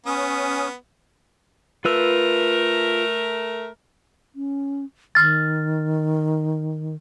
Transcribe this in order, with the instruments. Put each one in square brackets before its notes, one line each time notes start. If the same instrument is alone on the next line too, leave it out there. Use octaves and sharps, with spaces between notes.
[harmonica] B3 [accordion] C#4 D#6
[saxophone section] A3 A#4 [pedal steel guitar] F4 B4 E6
[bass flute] C#4
[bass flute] D#3 [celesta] F6 A6